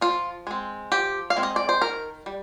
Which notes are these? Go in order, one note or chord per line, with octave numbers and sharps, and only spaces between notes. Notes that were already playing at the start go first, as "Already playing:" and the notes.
F3 F4
G#3 C4
F3 G4
F5
G#3 C4
D#5
D5
C5
D#3 A#4
G3